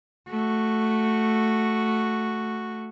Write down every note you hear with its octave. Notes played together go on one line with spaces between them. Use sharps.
A3 F#4